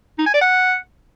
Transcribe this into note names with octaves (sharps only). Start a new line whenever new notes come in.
D#4
G#5
D5
F#5